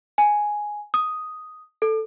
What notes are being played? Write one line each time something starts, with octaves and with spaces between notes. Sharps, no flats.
G#5
D#6
A4